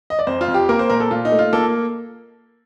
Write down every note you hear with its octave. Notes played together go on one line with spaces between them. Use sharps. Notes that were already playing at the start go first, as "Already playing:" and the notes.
D#5
D5
F2 C5
F4
F2
G4
A#3 A#4
C5
A#2 A#4
A4
A#2 F4
D#4
A3
F4
A#3 A4